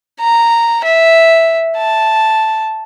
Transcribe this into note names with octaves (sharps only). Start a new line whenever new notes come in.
A#5
E5
A5